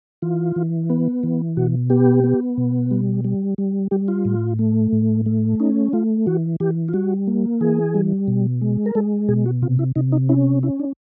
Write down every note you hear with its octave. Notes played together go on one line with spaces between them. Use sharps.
E3 F4
E3
B3
E3
B2 F#4
B3 G4
B3
B2
G3
G3
G3
G3 G4
F4
A2
A3
A2
A3
C#4 D#4
A3 F4
E3 F#4
E3 G4
F4
G3 F#4
A#3
E3 G#4
G3
B2
G#3
A#4
G#3 A4
B2 G#4
F#4
C3 F4
E4
C3 D#4
D#4
C#4 E4
C#4 E4
D4